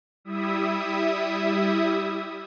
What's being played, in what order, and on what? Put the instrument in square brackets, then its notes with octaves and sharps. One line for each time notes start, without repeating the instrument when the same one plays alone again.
[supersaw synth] G3 E4 E5 D#6